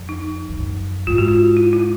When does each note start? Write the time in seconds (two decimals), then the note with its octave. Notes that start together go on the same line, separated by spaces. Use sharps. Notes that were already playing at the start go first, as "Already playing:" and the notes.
Already playing: F2
0.09 D#4
0.50 F2
0.58 F#2
1.07 G#2 F4
1.18 F#4
1.28 F4
1.57 E4
1.73 E4